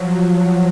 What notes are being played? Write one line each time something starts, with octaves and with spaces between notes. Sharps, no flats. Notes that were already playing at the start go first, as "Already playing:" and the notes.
Already playing: F3 F#3
F#3